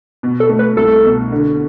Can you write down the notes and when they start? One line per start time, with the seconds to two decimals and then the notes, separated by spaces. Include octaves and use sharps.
0.23 B2
0.40 A4
0.49 A3
0.59 B4
0.77 C2 A4
1.04 B2
1.32 D3